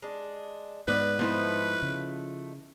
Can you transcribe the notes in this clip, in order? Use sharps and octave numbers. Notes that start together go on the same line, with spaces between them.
G#3 D4
G#2 B3 C4 B4 D5
F3 A3 B3 D#4 E4 C5
C#3